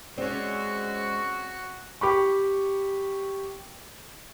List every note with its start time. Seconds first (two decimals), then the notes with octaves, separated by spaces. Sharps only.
0.18 G#3 C4 C#4 F#4 C5 D5 C#6
2.01 G4 B5 C#6